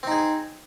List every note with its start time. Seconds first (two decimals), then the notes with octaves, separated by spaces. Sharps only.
0.03 C4
0.07 D#4
0.11 G#4